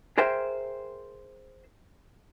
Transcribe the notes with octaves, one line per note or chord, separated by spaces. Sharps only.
G#4 A#4 C5 E5 G5